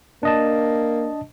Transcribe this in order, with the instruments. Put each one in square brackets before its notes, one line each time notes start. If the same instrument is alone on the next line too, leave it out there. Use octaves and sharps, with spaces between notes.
[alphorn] A#3 [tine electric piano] D4 D#5 A5